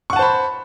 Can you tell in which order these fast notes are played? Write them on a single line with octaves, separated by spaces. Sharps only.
C#6 F#5 A5 C5 B5